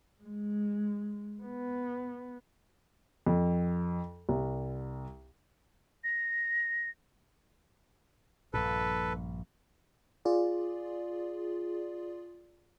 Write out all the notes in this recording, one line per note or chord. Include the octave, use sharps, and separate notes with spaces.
G#3
B3
F2
C2
A#6
A#1 G2 A#2 A4 B4
F4 G#4 D5